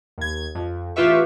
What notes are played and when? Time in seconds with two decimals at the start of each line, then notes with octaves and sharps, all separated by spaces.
0.18 D#2 G#6
0.55 F2
0.96 A1 F4 G4 B4 E5 C#6